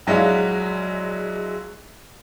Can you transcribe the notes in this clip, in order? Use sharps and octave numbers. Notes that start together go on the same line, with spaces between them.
A#1 F#3 G#3 E4 F5